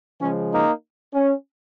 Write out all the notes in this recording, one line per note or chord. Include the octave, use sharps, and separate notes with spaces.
C#3 F3 G#3 C#4
A#3 D#4
C#4